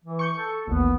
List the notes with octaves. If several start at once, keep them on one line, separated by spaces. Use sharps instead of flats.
E3
C#6 G6 C#7
A4
A1 D#2 B3